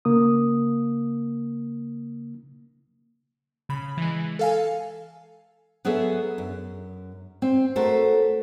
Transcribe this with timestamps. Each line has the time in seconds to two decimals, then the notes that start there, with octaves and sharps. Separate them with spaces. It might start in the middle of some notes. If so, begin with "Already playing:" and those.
0.05 C#3 A#3 D#6
3.69 C#3 B5
3.97 E3 G#3
4.39 A4 F5 G#5
5.85 F#3 B3 G#4 A4 B4 E5
6.38 F#2
7.42 C4
7.76 A3 F#4 A4 A#4 C5